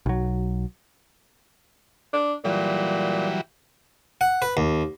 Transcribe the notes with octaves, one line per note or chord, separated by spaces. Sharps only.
B1 F#3
D4
A#2 E3 F#3 G3
F#5
B4
D#2